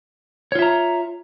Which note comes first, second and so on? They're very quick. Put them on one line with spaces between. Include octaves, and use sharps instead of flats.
C#5 F4 E5 A#5